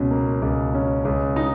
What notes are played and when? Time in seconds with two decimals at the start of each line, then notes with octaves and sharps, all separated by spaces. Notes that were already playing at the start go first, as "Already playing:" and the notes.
Already playing: C#2 B2 C#4
0.11 A#3
0.42 C#2
0.74 C#4
1.05 C#2
1.36 D#4